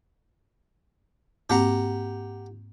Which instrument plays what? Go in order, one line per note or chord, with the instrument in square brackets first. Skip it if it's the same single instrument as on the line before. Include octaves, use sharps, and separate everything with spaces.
[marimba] G#2 A#3 C4 [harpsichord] G4 F#5 A#5